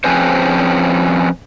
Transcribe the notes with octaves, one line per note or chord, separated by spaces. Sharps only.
F3 C4 C#4 G#4 B4 C5